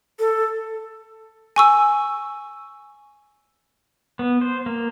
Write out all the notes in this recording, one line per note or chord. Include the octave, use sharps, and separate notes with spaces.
A4
G#5 C#6 E6
B3
C5
A#3